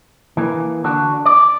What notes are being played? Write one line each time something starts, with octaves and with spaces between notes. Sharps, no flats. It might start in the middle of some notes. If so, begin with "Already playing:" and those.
E3 A#3 G#4
D3 D4 F#4
D5